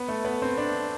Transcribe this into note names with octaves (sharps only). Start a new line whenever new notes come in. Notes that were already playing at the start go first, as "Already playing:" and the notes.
Already playing: B3
A3
B3
C4
D4